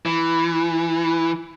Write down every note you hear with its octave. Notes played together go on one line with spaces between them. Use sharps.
E3